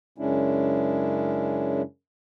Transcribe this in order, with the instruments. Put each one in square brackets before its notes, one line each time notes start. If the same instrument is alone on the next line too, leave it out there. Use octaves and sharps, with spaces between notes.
[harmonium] F#2 C#3 G#3 C#4 D4 E4